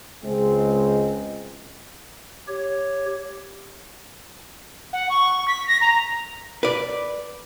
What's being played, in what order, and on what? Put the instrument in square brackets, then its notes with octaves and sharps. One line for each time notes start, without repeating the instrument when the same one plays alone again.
[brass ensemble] C#2 G#3 C4
[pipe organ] G4 C#5
[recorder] F#5
C#6
B6
A#6
A#5
[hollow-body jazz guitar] B4 D5